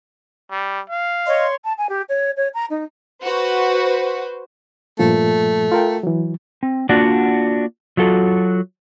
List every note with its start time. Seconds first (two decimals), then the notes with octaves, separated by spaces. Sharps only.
0.51 G3
0.90 F5
1.26 C#5 D#5 C6
1.64 A5
1.77 G#5
1.89 G4
2.09 C#5
2.36 C#5
2.54 A#5
2.70 D#4
3.21 F#4 B4 C5
4.99 G2 A#2 F3 A3
5.72 F4 A#4 G5
6.03 E3 F#3
6.63 C4
6.89 A#3 D4 F4 F#4 D5 F#5
7.97 F#3 F4 F#4 A4